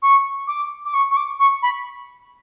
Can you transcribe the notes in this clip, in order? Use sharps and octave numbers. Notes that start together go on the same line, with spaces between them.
C#6
D6
D6
C#6
C#6
D6
C#6
B5